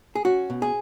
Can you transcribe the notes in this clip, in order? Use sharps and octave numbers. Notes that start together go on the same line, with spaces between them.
G#4
C#4 F#4
B2
G#4